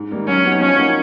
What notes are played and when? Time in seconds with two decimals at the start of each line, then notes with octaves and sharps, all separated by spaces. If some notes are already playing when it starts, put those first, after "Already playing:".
Already playing: G#2
0.11 D#3 G3 A#3
0.28 F#3 C#4
0.45 B3 D#4 F#4
0.61 F3 C#4
0.78 A#3 D#4 F#4